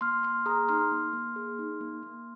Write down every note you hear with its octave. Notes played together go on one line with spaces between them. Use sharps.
A#3 C6 F6
A#3 C6 F6
G#4 A#5 D#6
D#4 C6 F6
A#3
A#3
G#4
D#4
A#3
A#3